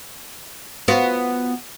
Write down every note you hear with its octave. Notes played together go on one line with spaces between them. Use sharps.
B3 F4 F#4